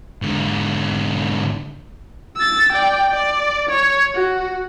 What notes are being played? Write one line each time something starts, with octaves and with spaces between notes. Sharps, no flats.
G#2 D3
E6 A6
D5 G5
D5
C#5
F#4